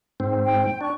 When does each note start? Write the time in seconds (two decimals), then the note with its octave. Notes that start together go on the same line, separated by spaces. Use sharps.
0.20 G#2 C4
0.45 G5
0.81 D4 C#6